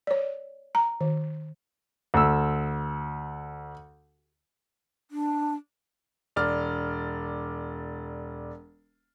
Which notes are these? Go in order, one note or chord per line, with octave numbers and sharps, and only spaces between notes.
C#5 D5
A#5
D#3
D2 E6
D4
E1 D5 F6